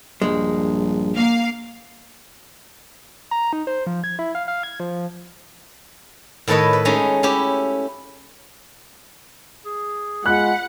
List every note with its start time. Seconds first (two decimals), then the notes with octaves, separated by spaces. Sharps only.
0.22 A#1 G2 G#3
1.15 A#3 F5 C7
3.31 A#5
3.53 D#4
3.67 C5
3.87 F3
4.04 G#6
4.19 E4
4.35 F5
4.48 F5
4.63 G#6
4.80 F3
6.48 A2 D#3 A4 B4 C#5 D#5
6.73 B4
6.85 G#3 A3 C#4 D#4
7.23 C#4 E4 G4
9.65 G#4
10.26 G#3 F4 F#5 B5 F#6